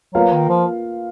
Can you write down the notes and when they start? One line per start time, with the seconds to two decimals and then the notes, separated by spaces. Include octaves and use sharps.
0.14 F#3 A#3 F4 B4 F5
0.32 D#3
0.49 F3